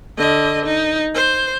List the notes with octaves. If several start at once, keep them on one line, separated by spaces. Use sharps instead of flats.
D3 D#5
D#4
C5